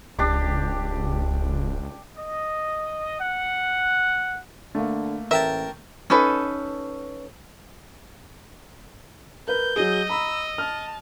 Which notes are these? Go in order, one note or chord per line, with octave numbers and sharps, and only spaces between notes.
D1 C#2 D4 G4 D6
D#5
F#5
D3 A3 A#3
A1 A#4 E5 G5 A5
C#4 D#4 A4 B4
A#4 B4 G6
F#3 G#4 D#5
A#5 B5 E6
A5 F6